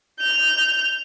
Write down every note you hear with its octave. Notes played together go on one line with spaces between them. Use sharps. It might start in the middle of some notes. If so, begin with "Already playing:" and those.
G6 F7